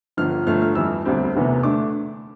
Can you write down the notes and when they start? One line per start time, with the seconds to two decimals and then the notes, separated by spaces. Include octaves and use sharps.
0.17 G1 G2 D3 F3 F6
0.46 G1 G2 F3 A3 F6
0.62 F6
0.75 F2 E3 G3 E6
1.05 E1 D2 D3 G3 C4
1.35 E1 D2 C3 E3 B3
1.63 D3 A3 D4 D6